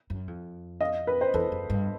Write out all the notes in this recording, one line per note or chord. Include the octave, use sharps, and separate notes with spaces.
F#2
F2
D#5 F5
B4
C5
E2 A4 B4
F#2
G2